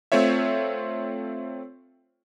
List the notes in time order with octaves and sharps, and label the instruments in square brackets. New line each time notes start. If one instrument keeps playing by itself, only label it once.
[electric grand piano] A3 C4 F4 C#5 E5